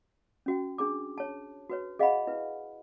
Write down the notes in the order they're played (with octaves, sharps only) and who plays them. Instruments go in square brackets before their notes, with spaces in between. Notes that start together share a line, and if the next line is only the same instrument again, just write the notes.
[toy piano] C#4 F#4 G5
D4 G#4 A#5 D6
C#5 A5
F#4 B4 C#5
G#4 D#5 F5 F#5 G#5 B5
E4 B4